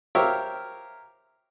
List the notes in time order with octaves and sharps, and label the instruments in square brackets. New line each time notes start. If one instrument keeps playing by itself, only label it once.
[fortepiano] G4 A#4 C5 C#5 E5 F5